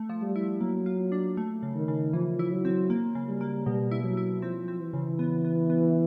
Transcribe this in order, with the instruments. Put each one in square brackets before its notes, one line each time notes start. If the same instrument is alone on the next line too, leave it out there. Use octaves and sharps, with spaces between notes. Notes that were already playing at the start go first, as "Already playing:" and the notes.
Already playing: [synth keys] A3
F3
[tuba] G3
[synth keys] E4
[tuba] F#3 [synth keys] A#3
[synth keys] F4
D4
A3
C#3
[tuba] D#3
[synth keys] C#3
[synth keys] E3 [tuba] F3
[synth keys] E4
[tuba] F#3
[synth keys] C4
A#3
C#3
[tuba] G3
[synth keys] A#3
[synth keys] B2 [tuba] G3
[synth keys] E4
[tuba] F#3
[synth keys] E4
[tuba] F3 [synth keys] C4
[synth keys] C4
[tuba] E3
[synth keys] C#3
B3
B3
B3